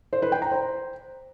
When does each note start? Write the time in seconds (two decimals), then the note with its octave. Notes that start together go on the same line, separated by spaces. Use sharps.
0.13 C5
0.22 B4
0.32 G5
0.42 A#5
0.52 C5